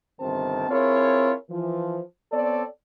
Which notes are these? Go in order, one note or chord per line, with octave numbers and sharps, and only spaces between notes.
G1 C3 D#3 C4 C5 A5
C4 E4 F4 G#4 A#4 C#5
E3 F3
B3 C4 A4 C#5 D5